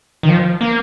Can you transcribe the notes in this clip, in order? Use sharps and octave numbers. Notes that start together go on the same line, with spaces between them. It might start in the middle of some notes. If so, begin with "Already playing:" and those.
D#3
F3
A#3